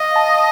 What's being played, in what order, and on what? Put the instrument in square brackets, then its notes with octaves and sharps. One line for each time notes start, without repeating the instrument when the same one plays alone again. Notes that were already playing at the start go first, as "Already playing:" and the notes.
Already playing: [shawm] D#5 [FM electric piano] F5
[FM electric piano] A5